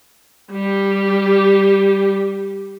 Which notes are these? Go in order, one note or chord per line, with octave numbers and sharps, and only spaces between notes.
G3 G4